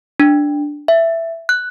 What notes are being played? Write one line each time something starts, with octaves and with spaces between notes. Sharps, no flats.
D4
E5
F#6